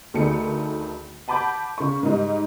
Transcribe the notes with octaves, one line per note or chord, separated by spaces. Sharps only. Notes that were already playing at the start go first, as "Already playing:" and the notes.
D2 D3 D#3 A3 G#4 C#7
F#5 A5 B5 D6 G6
C#3 C#6
G#2 G3 D#4